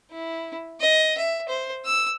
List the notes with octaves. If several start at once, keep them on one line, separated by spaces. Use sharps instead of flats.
E4
D#5
E5
C5
E6